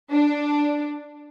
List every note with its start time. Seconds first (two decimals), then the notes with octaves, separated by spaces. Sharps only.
0.11 D4